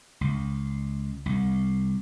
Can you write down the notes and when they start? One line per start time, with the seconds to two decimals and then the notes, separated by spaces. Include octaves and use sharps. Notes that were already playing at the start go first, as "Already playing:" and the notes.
0.21 C#2
1.26 C2